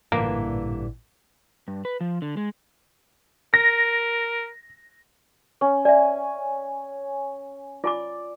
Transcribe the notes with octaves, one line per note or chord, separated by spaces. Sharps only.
A1 G2 A#2 D3 E3 A#3
G2
B4
F3
D3
G#3
A#4 A#6
C#4
D5 E5 G#5
F4 D5 G#5 D6